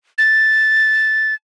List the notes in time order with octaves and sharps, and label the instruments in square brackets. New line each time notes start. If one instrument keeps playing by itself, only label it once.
[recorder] A6